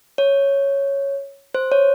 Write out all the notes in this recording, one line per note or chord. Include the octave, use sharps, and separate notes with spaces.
C#5
C5
C#5